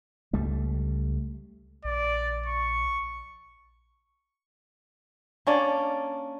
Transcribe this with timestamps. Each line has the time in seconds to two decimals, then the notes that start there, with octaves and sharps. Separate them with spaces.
0.33 C#2 G3 A3
1.85 A#1 D5
2.46 C#6
5.47 A#3 C#4 D4 D5